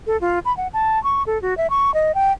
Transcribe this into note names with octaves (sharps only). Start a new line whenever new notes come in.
A4
F4
B5
F#5
A5
C#6
A4
F#4
E5
C#6
D#5
G5